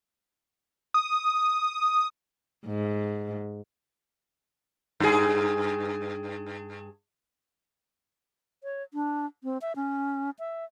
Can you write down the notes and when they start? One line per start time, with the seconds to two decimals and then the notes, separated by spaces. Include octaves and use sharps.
0.94 D#6
2.66 G#2
5.00 G2 G#4
8.64 C#5
8.94 D4
9.44 C4
9.62 E5
9.76 C#4
10.39 E5